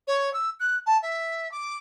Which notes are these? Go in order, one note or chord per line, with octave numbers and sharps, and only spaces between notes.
C#5
E6
F#6
A5
E5
D6